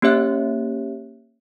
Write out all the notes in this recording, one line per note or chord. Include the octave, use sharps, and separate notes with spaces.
A#3 C#4 G4 C#5 E5 F#6